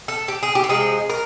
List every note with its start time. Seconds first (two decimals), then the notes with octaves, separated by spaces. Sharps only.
0.08 A4
0.28 G4
0.43 G#4
0.55 G4
0.64 A4
0.69 C3 F3 G#3 G#4
1.10 A#4